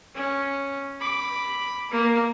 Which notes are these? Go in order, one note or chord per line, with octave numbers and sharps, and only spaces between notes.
C#4
B5 D6
A#3